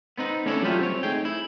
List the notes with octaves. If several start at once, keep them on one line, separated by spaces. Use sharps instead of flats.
B3 C4 D#4 B4
A3 C#4 D4 E4 G4 A4
F#3 G3 A3 C#4 F4 G4
C4 C#5
A3 D#4 G#4 G5
E4